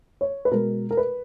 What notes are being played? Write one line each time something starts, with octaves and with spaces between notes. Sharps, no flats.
C#5
B4
B2 G#3 A#4
A#4
B4